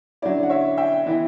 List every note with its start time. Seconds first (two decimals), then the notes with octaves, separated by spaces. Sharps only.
0.22 D3 F#3 C#4 E4 D5
0.43 F#5
0.49 C#5 E5
0.77 E5 G5
1.07 E3 B3 E4